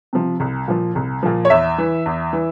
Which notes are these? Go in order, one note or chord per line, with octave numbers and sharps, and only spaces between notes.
C3 F3
C2
A#2 F3
C2
A#2 F3
C#5
E2 E5
E3
E2
E3